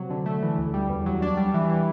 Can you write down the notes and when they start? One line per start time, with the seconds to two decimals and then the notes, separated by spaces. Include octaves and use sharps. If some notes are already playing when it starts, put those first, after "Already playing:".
Already playing: C3 F#3
0.10 D3
0.26 A3
0.42 E3
0.58 D2
0.74 G3
0.89 E2
1.06 F#3
1.22 D4
1.37 G3
1.54 E3
1.70 E3